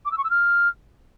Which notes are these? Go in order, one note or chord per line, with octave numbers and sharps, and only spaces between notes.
D6
E6
C#6
E6
F6